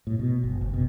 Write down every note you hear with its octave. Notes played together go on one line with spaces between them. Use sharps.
A2
B2
G1
F#1
B2